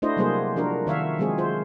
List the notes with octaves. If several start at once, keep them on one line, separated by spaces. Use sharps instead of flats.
A3 D4 E4 F#4 C5 D#5
C3 F#3 G3 A#3 G#4 C5
F3 D4 F#4 A#4
D#3 C#5 E5 F5
F3 F#3 G#3 C4 G#4
F4 C5